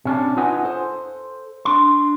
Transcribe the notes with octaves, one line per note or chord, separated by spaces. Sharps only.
C3 C#4 D4
D#4 F4 B4 D#5 F#5 G#5
A4 C5
D4 C6